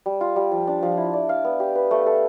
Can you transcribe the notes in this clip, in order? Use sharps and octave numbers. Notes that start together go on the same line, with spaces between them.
G3
F4
G3
F3
D4
F3
E4
D5
F5
B3
G4
B4
A3
A4